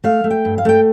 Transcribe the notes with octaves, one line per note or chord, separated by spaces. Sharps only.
A3 F5
A3
G5
G2
F5
A3 G5